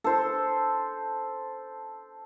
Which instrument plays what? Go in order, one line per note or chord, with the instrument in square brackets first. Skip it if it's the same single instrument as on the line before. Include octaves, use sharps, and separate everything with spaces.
[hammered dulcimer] A4 C5